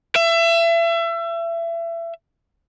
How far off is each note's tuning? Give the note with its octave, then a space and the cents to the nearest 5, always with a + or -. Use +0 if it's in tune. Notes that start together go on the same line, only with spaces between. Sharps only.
E5 +30